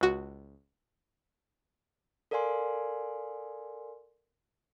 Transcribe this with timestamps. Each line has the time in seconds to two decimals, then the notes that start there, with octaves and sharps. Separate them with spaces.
0.01 C#2 F#4
2.31 A4 A#4 D5 F5 G#5 C6